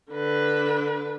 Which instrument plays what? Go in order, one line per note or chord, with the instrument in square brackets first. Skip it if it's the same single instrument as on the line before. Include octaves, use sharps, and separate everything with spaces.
[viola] D3 B4